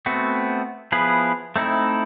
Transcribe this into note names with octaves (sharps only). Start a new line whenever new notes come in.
A3 B3 C4 F#4
F3 B3 E4 G#4 B4
A3 C4 D#4 E4